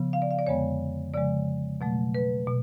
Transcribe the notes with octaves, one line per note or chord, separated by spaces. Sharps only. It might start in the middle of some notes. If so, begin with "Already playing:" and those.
Already playing: C#3 F3 B3
F5
D5
F5
D5
F2 D3 G#3 B3 C#5
C#3 F3 G#3 D5
B2 F#3 A3
B4
B2